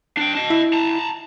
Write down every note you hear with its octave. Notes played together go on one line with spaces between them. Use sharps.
D4 G5
D#5 A5
E4
A5 A#5